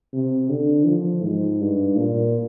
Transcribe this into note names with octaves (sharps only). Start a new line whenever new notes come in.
C3
D3
F3
G#2
G2
A#2